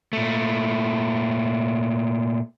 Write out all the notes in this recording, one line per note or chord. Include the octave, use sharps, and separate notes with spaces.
A#2 A3